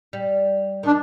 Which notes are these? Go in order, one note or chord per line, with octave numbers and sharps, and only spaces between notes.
G3
D#3
D4